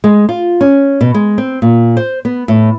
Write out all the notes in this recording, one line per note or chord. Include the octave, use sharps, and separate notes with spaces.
G#3
F4
C#4
B2
G#3
C4
A#2
C5
B3
A2